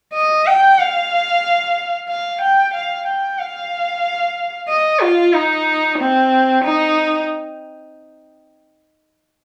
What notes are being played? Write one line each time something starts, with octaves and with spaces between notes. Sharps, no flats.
D#5
G5
F5
F5
G5
F5
G5
F5
D#5
F4
D#4
C4
D#4